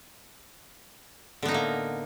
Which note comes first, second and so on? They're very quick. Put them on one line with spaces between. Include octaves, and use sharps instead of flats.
D3 B3 D#4 A2 A#3